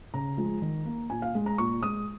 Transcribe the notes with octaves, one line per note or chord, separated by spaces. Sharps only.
C#3 A#5
F3 G#3
D#3
A#3
A#2 G#5
F5
G#3
A#5
A#2 C#6
G#3 D#6